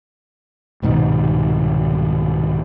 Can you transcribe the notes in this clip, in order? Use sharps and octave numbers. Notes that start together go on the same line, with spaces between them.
C2 G#2 B2 D#3